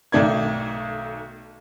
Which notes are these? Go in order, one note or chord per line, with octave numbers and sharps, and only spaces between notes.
B1 D#3 A3 D5 G#6